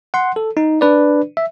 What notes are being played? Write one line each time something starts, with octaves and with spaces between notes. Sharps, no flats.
F#5 C6
A4
D#4
D4 B4 D5
E5